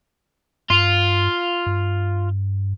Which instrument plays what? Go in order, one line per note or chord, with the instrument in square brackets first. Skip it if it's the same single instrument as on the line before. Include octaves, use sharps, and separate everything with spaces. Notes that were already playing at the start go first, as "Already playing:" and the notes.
[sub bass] G2 [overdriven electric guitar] F4
[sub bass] G2